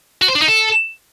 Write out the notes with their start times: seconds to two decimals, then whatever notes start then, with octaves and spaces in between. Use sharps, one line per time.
0.22 F#4
0.28 C5
0.35 D4
0.42 D#4
0.49 A4